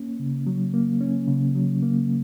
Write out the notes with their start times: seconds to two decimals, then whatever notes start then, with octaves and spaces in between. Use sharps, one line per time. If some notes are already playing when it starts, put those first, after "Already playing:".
Already playing: A#3 C#4
0.19 C#3
0.47 F#3
0.74 A#3
1.01 C#4
1.28 C#3
1.55 F#3
1.83 A#3